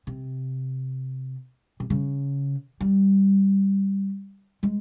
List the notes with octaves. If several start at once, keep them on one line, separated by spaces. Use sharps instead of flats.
C3
C3
C#3
G3
G#3